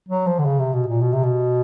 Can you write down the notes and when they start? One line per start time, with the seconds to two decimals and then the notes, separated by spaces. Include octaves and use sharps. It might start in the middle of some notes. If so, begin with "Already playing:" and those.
0.09 F#3
0.26 F3
0.39 D3
0.45 C#3
0.59 C3
0.73 B2
0.88 A#2
1.02 B2
1.13 C3
1.23 B2